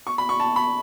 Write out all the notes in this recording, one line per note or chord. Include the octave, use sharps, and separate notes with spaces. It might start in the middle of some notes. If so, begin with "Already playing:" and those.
C#6
B5
C#6
A5
B5